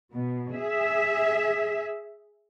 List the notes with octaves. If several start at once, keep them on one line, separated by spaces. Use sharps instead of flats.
B2
G#4 E5